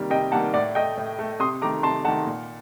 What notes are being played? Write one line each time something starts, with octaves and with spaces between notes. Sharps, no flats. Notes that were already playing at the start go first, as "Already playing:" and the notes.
Already playing: C3 D#3 G3 A#3
C3 D#5 G5
D#3 G3 A#3 F#5 A5
A2 D5 F#5
A3 D#5 G5
A2
A3
C3 C6 D#6
D#3 A3 A#5 D6
C3 A5 C6
D#3 A3 F#5 A5
A#2